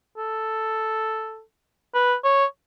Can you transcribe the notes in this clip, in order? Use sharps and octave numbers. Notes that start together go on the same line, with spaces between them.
A4
B4
C#5